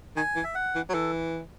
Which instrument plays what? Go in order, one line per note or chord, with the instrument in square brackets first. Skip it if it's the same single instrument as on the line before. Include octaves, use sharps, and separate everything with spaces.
[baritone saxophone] D#3 [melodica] G#5
[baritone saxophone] E3
[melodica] E5
F#5
[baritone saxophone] E3
F#3
[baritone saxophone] E3 [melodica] A4